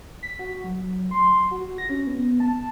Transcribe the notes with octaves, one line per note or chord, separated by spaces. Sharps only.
B6
F#4
F#3
C6
F#4
A#6
C#4
B3
A5